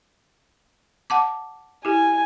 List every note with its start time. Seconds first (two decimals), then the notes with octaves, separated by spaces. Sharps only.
1.10 F#5 A5 D6
1.85 E4 G4 G#5